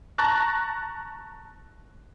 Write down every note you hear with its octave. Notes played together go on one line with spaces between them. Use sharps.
A5 A#5 C#6 F#6 A6 A#6